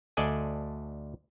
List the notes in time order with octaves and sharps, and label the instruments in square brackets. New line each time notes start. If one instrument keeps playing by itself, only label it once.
[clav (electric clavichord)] D2 D4 A4 D5 D#5 G#5